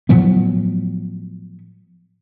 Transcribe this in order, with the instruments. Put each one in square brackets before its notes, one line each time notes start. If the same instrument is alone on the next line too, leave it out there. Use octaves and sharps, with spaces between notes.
[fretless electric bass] A2 F3 F#3 B3